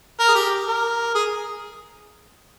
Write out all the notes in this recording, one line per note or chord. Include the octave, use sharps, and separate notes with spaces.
A#4
G#4
G4
A#4
G#4